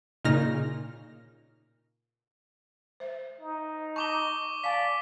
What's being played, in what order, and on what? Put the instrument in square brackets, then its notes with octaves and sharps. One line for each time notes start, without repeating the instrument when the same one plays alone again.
[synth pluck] A#2 C#3 D#4 F6 A#6
[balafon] C5 E5
[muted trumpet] D#4
[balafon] A5 [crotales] C#6 D6 G7
[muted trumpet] D5 [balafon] F5 G#5 A5 [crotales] B6